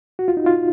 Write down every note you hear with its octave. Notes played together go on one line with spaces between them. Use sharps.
F#4
F4
D#4
F4